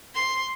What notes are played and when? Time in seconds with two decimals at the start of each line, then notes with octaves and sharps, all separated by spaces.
0.15 C6